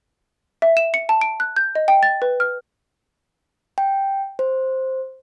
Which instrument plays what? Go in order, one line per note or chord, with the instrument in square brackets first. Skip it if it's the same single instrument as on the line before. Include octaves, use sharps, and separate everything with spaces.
[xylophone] E5
E7
C#7
A5
D7
F#6
G6
D#5
G5
A6
B4
F6
[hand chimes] G5
C5